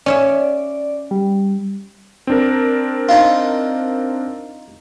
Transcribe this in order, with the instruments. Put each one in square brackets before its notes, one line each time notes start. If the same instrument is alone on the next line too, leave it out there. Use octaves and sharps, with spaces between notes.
[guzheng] C#4 C#5 E5 [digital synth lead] D5
[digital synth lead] G3
[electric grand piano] C4 D4 A#4
[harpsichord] D#4 F4